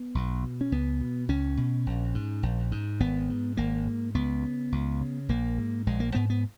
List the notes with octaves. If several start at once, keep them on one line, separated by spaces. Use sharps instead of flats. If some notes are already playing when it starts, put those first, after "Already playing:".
Already playing: B3
B1
B2
C#4
C#2 B3
B2
C#2 C#4
B2
A#1
G#2
A#1
G#2
G#1 B3
G#2
G#1 A#3
G#2
C#2 B3
C#3
C#2
C#3
A#1 A#3
G#2
A#1 G#3
A#3
G#2 B3
B3